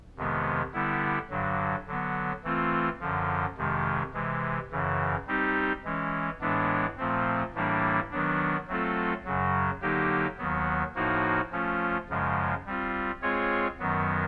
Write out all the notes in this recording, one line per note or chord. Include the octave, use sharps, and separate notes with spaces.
F2 C3 D#3 G#3 B3
D3 G3 B3 E4
G2 D3 F#3
D3 F#3 B3
E3 A3 C4 F4
F#2 D3 F3
F2 C3 D#3 G#3
C3 E3 G#3
F#2 C#3 E3
G3 C4 D#4 G4
E3 G#3 C#4
A2 E3 G#3 B3 D4
A#2 F3 A3 C4
A2 E3 G3 A#3 D4
D#3 F#3 B3 D4
F#3 A3 C4 F4 A4
F#2 C#3 F#3
D3 F#3 A#3 D#4 G4
D#2 D#3 F#3 B3
A2 F3 A#3 D#4 F#4
F3 A3 C#4 F4
F#2 C#3 F3 G#3
G3 C4 F4
G#3 C4 F4 G#4 C#5
F#2 D#3 F#3 B3